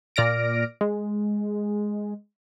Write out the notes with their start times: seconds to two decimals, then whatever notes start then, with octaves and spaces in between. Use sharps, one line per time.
0.16 A#2 D5 F6 A#6 D7
0.81 G#3